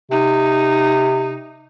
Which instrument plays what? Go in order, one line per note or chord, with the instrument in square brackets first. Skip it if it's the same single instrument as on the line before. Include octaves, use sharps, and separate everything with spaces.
[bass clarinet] C3 [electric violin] D#4